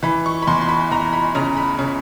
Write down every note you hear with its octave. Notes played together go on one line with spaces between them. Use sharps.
E3 B5
C#6
B5
E2 C6
C6
B5
E2 A#5
B5
C#3 A#5
B5
C#3